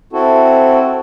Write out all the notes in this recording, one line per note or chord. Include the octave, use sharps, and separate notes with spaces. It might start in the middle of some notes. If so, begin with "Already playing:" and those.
C4 E4 F#4 A4